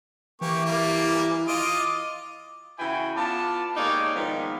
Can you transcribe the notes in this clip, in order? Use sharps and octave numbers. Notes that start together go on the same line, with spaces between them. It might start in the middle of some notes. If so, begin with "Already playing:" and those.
E3 A#3 G4 C#6
G3 A#3
F4 D#5 D6
C#3 E3 E4 F#4 G5 G#5
B3 F4 D5 A5
G#3 A#3 D#4 G4 C#5 D5
G#2 D#3 F3 A#3 B3